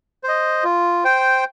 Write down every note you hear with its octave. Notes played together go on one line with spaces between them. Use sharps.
C5 D#5
F4
C5 G5